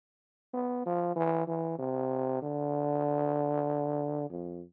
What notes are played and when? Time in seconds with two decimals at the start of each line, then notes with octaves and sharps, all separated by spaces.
0.54 B3
0.86 F3
1.16 E3
1.48 E3
1.79 C3
2.42 D3
4.30 F2